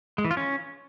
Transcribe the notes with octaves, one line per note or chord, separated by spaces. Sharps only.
G#3
E3
F4
C#4